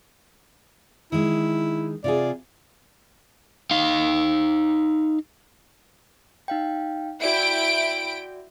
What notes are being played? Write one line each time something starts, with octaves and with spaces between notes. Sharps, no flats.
D#3 G#3 E4
C3 F4 G#4 D5
D#4 F5
D#4 F5 G5
E4 F#4 D5 E5 G5 D7